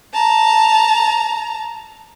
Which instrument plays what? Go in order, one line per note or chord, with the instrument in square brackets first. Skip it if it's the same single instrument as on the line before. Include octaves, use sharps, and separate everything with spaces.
[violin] A5 A#5